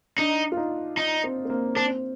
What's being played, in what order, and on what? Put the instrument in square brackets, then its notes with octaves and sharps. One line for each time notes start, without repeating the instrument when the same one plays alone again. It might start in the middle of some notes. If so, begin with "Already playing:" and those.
[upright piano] D4 [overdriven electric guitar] D#4
[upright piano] F4
D#4
[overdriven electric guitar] D#4
[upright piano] C4
C4
A#3
[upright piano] C4 [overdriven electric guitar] D4